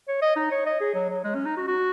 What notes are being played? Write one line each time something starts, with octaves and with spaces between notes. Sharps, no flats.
C#5
D#5
D#4
C#5
D#5
G#4
F#3
F#3
G#3
C#4
D#4
F#4
F#4